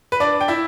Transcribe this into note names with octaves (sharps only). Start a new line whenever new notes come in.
B4
D4 D5
G5
E4 E5